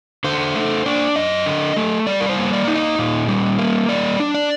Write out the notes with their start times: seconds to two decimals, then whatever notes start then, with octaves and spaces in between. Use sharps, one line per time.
0.24 D3 C5
0.55 A3
0.86 D4
1.16 F#2 D#5
1.46 D3
1.77 A3
2.07 G3 D5
2.20 A#4
2.29 C5
2.38 A#3
2.53 D5
2.68 D#4
2.75 D#5
2.99 A#2
3.28 G3
3.59 A#3
3.89 G3 D5
4.20 D4
4.34 D5